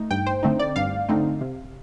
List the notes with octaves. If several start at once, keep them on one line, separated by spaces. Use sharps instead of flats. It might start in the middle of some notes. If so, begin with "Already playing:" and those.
Already playing: A3 D#4
G2 G5
C5
D3 A3 C4 D#4
D5
G2 F5
D3 A3 C4 D#4
C3